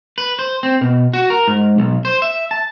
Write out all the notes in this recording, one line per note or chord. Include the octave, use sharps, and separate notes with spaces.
B4
C5
C4
B2
F#4
A#4
G#2
B1
C5
E5
A5